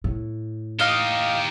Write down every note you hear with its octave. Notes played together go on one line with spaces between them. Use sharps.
A2
D#4 G4 D#5 F5